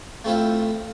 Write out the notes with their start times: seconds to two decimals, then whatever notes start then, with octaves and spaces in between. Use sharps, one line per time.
0.24 A3 C4 E4 F4